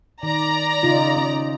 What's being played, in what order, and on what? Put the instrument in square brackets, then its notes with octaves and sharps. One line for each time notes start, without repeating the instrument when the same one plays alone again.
[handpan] D#3 [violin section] D5 A#5
[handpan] C#3 D#4 F4
C#4